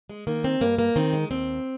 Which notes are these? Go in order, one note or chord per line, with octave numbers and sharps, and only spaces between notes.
G#3
D#3 A#3
C4
G2 A#3
A#3
D#3 C4
G#3
D#2 C4